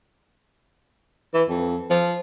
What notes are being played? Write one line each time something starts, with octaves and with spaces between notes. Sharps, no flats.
E3
F2
F3